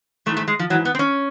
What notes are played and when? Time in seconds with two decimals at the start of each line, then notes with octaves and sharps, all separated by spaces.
0.26 G#2 E3 A3
0.37 A3
0.48 G#3
0.59 F3
0.70 G#2 E3 F#3
0.85 B3
0.95 C4
0.99 C#4